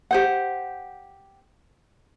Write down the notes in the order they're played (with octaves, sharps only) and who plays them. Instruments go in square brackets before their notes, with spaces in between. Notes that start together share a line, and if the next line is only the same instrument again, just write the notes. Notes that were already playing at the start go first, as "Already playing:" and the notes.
[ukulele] G4 C5 F#5